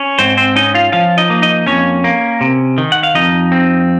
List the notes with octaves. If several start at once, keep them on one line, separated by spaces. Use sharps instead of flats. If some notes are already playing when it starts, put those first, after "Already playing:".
Already playing: C#4
G#2 C4 C5
C4 C5
C#4 D#4 D#5
F4 F5
F3 F4 F5
D#4 D#5
A#3
D#4 D#5
F2 C#4 C#5
A#3
C3
D#3
F#5
F5
F2 D#4 D#5
C4